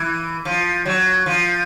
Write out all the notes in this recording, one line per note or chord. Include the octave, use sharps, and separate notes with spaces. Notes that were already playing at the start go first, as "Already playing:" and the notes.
Already playing: E3
F3
F#3
F3